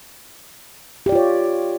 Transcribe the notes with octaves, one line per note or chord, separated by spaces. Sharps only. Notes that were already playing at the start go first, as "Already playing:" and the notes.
F4 G4 C#5 D5